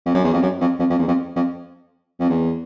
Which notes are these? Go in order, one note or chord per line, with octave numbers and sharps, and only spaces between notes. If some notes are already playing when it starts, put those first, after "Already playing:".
F2
F#2
E2
F2
F#2
F2
F2
F2
E2
F2
F2
F2
E2